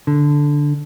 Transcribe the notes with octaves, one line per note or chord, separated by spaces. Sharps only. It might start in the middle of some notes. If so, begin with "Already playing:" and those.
D3